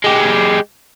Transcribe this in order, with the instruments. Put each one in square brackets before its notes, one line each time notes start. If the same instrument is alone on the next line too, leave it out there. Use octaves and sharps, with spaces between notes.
[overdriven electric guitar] G#3 G4